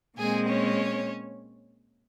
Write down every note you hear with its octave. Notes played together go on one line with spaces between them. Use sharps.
A#2 G#3 C4 G#4 G#5
C#4 C#5